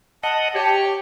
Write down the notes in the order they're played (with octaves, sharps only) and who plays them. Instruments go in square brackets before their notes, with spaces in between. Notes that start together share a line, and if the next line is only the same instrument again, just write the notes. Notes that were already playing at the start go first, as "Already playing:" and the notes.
[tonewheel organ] D#5 F#5 [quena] A5
[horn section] G4 [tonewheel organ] C#5